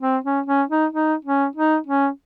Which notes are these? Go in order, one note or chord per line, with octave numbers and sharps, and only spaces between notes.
C4
C#4
C#4
D#4
D#4
C#4
D#4
C#4